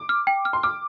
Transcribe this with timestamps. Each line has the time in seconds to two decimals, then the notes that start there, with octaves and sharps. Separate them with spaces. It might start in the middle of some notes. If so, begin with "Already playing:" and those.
Already playing: D6
0.09 F6
0.27 G5
0.45 F6
0.53 C6
0.63 D6 F6